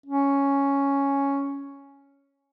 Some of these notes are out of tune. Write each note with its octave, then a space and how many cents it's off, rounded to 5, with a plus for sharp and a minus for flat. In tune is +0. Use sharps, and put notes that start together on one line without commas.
C#4 +0